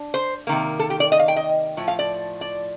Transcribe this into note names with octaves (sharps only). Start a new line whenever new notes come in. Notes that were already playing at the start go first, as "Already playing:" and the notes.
Already playing: D4
C5
C3 D#3 A#3
A4
G4
D5
D#5
F5
G5
D#5
A2 F3
F5
D5
D5